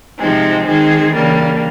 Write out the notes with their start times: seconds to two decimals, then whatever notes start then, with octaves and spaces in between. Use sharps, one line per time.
0.19 C3 F3 G#3 C4 D#4
0.65 D#3 G#3 C4 D#4 G#4
1.11 C#3 E3 G3 A#3 D4